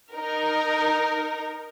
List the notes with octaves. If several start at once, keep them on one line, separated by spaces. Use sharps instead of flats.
D#4 A#4